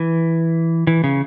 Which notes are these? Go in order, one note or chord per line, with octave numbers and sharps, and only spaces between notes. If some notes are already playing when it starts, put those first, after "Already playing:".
Already playing: E3
E3
C#3